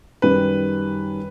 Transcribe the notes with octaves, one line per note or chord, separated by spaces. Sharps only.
F#2 D#3 G3 B4